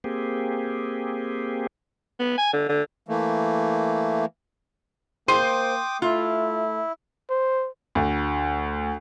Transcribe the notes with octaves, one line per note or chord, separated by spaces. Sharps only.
A#3 C4 G4 G#4
B3
G#5
D3
D3
E3 A3 A#3
A#3 C5 G5 C6 D6 D#6 C7 D#7
A3 E4 F4
C5
D2